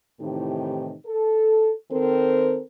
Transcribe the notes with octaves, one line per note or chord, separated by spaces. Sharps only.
A2 C3 D#3 E3 D#4 G4
A4
D#3 C4 A4 A#4 C5